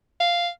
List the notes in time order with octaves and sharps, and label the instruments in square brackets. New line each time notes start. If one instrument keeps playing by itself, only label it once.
[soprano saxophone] F5